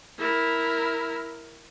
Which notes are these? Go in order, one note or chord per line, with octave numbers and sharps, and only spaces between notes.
E4 A#4